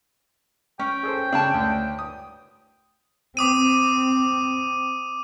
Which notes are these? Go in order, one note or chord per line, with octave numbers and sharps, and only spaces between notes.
C#4 G5 F6
G#4 A4 C5
C#3 D4 C#5 A5
D2
D#6
C4 D6 D#6 D#7